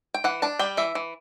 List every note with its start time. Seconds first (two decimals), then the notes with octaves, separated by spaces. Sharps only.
0.14 G5
0.24 E3 F#5
0.42 D4 A5
0.59 G3 G5
0.77 E3 E5
0.95 E3